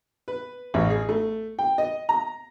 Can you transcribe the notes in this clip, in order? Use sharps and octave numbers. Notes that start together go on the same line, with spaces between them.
B4
A1
G#4
A3
G5
D#5
A#5